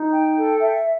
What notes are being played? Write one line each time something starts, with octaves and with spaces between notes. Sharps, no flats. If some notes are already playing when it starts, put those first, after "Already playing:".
Already playing: D#4
G5
A4
E5